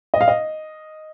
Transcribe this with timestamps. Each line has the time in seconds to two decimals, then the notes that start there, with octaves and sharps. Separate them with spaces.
0.14 D#5
0.21 F5
0.28 D#5